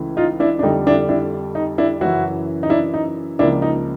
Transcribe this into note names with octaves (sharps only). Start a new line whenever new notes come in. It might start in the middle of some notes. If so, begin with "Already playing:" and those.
Already playing: C#2 C#3 E3 A3
D#4 F4
D4 E4
D4
F2 D3 G3 D#4
D4 E4
D4 E4
D#4
D4 E4
F#2 C#3 E3 E4 F#4
D#4
D4 E4
D#4
C#2 C#3 F3 A#3 D4 E4
D#4